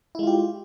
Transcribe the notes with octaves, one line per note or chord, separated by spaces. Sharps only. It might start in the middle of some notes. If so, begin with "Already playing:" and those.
G#3 E4 F4 G4